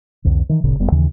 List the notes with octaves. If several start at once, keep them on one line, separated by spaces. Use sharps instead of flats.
C2 F2 D3
D#3 E3
D1 G#1 A#2 C#3
F1 G3 B3
D#2 C#3 E3